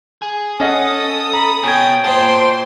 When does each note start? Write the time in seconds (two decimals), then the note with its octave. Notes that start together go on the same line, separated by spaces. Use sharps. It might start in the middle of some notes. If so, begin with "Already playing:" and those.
0.22 G#4
0.60 C#4 A4 D#5 F#5 D#6
1.34 A#5 B5
1.63 B2 C#5 G5 G#5 G#6
2.04 A#2 C5 D#5 G5 A5 C6